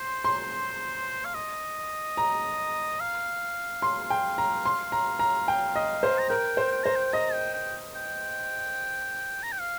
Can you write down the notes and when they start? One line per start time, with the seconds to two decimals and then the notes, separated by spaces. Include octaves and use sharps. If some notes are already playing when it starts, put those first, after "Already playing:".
Already playing: C5 C6
0.24 C6
1.25 F5
1.35 D#5
2.17 A#5
3.00 F5
3.82 C6
4.10 G5
4.38 A#5
4.65 C6
4.92 A#5
5.19 A#5
5.48 G5
5.76 D#5
6.03 C5
6.19 A#5
6.30 A#4 G5
6.57 C5
6.72 G5
6.84 C5 A#5
6.96 G5
7.13 D#5 A#5
7.33 G5
7.54 G5
7.96 G5
9.43 A#5
9.52 G5
9.60 F5